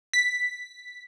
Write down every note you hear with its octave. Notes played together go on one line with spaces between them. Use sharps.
B6